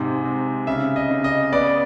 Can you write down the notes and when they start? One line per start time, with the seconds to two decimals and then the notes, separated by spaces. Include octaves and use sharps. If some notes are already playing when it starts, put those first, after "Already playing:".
Already playing: G#2 C3
0.26 C3
0.67 C#3 E5
0.96 D#5
1.11 C#3
1.24 D#5
1.52 B3 D5